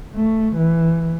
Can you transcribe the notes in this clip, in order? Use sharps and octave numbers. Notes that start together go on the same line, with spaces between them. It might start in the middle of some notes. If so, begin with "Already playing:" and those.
A3
E3